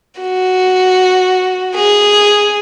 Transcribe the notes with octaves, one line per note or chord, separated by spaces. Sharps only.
F#4
G#4